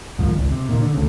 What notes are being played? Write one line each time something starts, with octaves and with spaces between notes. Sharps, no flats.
C2 G#2 D#3 F3
G#1 C#2
C3
A#2 D#3
D3
D2 C#3